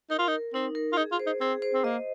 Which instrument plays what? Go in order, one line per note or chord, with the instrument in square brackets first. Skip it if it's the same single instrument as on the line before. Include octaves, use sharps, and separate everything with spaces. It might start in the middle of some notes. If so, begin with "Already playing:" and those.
[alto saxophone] D#4 [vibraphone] A#4
[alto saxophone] F4
D#4
[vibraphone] A#4
[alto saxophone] C4 [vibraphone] D#4
[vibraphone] A#4
[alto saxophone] F4
[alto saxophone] D#4 [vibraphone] G#4
[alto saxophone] F4
[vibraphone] C5
[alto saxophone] D#4
[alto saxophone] C4 [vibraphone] G#4
[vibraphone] C5
[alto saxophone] C4
[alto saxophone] A#3 [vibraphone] D#5